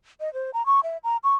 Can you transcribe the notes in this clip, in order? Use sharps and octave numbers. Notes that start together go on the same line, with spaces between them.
D#5
C5
A#5
C#6
E5
A#5
C#6